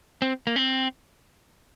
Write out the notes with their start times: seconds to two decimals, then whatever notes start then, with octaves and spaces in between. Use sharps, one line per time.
0.22 C4
0.47 A#3
0.56 C4